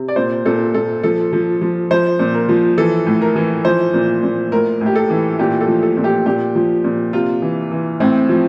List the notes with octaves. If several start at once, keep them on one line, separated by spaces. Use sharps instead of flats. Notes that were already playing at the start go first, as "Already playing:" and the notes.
Already playing: C3
D5
A#2 C5
A#2 A4
A#2 A4
F3 A4
F3
F3
F3 C5
A#2
A#4
F3
E3 A4
A2
A#4
E3
F3 C5
A#2
A#2
A2 A#4
A2
G4
A4
E3
A#2 G4
A4
F3
A4
A#2
G4
A#2 G4
F3
A#2
C3 F4
E3
E3
A2 C4
F3